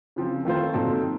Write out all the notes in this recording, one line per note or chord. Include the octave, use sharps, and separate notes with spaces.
C#3 F3 C4
D#3 A3 C4 F4 C5
A#2 F#3 C4 D#4 A4